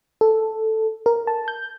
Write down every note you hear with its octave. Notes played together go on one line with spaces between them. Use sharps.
A4
A#4
A5
G6